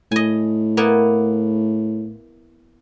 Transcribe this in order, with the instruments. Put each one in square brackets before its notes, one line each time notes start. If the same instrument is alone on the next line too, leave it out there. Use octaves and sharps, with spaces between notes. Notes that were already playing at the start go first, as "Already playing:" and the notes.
[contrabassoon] A2 [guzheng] D#5 G#5
[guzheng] A#3 B3 E4